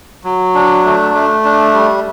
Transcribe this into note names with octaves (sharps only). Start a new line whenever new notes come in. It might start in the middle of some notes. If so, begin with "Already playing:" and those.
F#3
D4
A3
A3
D4
G3